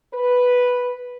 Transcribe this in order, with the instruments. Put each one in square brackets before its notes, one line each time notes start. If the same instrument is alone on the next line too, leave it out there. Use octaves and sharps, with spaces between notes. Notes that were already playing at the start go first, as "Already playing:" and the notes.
[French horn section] B4